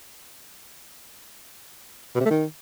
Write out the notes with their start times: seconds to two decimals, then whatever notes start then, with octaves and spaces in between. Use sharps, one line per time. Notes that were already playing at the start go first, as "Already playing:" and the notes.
2.15 B2
2.20 C3
2.25 A3
2.30 D#3